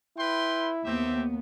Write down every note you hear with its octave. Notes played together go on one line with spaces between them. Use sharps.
E4 B4 G5 C6
D#2 B3 C4 G4 E5